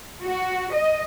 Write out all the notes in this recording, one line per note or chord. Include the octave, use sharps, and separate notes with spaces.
F#4
D#5